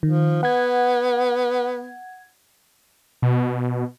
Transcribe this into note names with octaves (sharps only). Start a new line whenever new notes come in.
D#3 F3
B3 F#5 G#6
B2